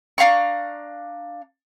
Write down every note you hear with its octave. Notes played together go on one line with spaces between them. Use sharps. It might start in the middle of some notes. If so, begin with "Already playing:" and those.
D4 F5 A#5 C#6